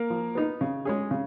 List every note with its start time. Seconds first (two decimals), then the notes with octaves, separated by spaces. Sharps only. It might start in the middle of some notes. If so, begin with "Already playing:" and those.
Already playing: A#3 A#4
0.10 F3
0.35 B3 D#4
0.61 C#3
0.85 G#3 C#4 G#4
1.11 C#3